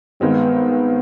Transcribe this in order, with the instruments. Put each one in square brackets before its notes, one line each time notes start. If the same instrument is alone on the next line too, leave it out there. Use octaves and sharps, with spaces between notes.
[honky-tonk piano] G2 D#3 G#3 C4 [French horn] B3